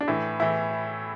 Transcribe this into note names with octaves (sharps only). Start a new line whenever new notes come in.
D4
A2 E3 E4
A2 E3 E4